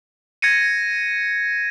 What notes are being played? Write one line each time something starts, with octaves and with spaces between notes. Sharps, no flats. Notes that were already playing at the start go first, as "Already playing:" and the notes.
G#6 A#6 C#7 D#7